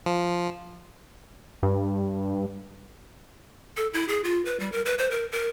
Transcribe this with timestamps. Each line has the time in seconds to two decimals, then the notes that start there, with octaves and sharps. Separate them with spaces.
0.06 F3
1.63 G2
3.77 A4
3.94 E4
4.08 G#4
4.24 F4
4.45 B4
4.60 G3
4.72 A#4
4.86 B4
4.99 C5
5.11 A#4
5.32 A#4